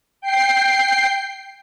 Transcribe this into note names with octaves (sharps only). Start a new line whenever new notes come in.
G5 C7